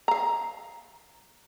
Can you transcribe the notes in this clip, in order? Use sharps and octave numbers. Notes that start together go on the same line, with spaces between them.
F5 A#5